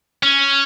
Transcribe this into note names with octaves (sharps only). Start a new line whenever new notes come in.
C#4